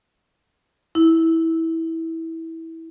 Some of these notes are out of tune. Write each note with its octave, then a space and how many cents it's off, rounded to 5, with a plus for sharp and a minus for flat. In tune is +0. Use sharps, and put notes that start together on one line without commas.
E4 -20